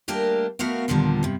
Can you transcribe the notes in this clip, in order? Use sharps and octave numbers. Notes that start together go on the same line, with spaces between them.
G3 A3 A#3 D4 G4 A#4
A3 B3 F#4 A#4 F5
D#2 A#2 D3 F3 G3
G2 C3